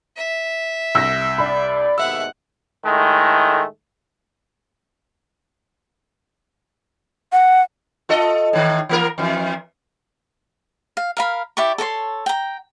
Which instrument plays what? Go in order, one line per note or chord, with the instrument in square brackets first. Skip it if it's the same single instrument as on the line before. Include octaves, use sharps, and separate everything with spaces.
[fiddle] E5
[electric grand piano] C2 [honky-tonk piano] E6 A#6
[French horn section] D5 [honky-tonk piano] B5
[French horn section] D#2 G#2 B2 [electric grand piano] E5 E6 [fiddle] F#5
[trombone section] A2 D#3 G#3 A3
[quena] F#5
[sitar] F4 A4 D#5
A2 D#3
E3 A#3 A#4
F2 E3
[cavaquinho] F5
A#4 F5 B5
E4 G4 D5 C#6
A4 C#5 D5 C6
G5 A#5